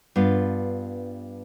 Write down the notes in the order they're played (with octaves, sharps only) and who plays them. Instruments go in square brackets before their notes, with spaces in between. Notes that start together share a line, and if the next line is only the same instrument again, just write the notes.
[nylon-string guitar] G2 B3 F4